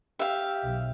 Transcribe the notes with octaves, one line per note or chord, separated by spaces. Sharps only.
G4 E5 F5
B1